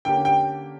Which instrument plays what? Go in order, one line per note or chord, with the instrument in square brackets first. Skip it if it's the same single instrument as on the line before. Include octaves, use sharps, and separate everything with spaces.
[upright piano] D3 A#3 C#4 G4 [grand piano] G5
[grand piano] G5